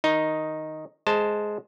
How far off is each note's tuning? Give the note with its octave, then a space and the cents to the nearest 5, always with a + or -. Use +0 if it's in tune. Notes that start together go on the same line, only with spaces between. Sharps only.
D#3 +0 D#4 +0
G#3 +10 C5 +0 A5 +0